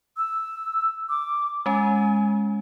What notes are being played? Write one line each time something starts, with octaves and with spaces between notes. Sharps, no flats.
E6
D6
G#3 C#4 G#5